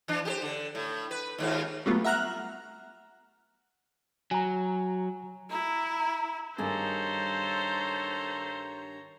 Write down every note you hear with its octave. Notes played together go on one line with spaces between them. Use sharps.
E3 D4
G4 G#4 C5
D3
A2
B4
D#2 G#2 F4
F#3 G3 A3 B3 F4
E5 F#5 A#5 F6 F#6
F#3 G#5 A#5
E4 A#5
G2 D#3 G#4 A4 C5 C#5 A#5